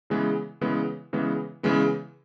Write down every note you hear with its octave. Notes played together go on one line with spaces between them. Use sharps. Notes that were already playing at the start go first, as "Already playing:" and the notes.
C#3 E3 G#3 B3
C#3 E3 G#3 B3
C#3 E3 G#3 B3
C#3 E3 G#3 B3